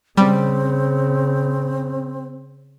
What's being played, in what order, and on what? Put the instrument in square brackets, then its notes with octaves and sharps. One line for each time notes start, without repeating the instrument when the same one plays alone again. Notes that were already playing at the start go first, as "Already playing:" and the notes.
[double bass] C#3 [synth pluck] G3 [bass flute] C4